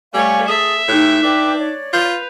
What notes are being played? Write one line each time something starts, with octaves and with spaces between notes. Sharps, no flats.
G3 A3 C#5 F5 G#5
G#4 A4 E5
A2 D#4 G4 F#6
D4 B4 G5 D6
C#5 D5
F4 B4 G6 F7